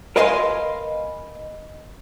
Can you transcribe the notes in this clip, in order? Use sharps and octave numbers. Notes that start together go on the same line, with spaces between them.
A#4 B4 D#5 F5 G#5 C6